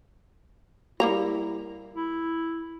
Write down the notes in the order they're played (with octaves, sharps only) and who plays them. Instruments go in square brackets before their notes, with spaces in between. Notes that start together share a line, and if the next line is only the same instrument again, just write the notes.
[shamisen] G3 A#3 A#5 [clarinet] E4
[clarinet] E4